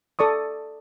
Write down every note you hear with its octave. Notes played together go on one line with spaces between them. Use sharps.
A4 D5 C#6 D#6